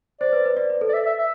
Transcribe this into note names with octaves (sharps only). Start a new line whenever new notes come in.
C5 D5
B4
B4
D5
B4
A4
D5
E5
E5
E5